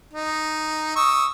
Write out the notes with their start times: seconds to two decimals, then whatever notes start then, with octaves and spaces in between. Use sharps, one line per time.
0.13 D#4
0.96 C#6 D#6 E6